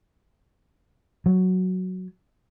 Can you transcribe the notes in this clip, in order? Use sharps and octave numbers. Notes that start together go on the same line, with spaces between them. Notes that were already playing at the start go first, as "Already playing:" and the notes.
F#3